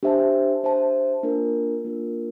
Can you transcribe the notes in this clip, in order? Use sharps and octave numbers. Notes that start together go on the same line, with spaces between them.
D4 G4 C5 E5 A5
D4 G4 C5 E5 A5
A#3 D4 F4 A#4
A#3 D4 F4 A#4